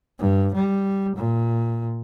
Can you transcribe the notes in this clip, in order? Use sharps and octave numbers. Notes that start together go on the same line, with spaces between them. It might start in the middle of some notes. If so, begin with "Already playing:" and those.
G2
G3
A#2